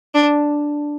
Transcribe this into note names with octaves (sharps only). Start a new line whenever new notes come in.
D4